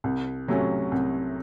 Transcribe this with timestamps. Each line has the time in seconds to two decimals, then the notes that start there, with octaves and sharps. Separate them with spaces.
0.04 C2
0.48 C3 F#3 A3 C#4
0.92 C2